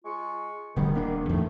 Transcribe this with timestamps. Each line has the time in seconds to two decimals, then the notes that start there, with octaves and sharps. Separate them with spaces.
0.04 G#3 F4 C#6
0.76 D1 D3 D#3 G3 B3
0.95 D#1 A#3 D4
1.29 E2 A2 A3 D#4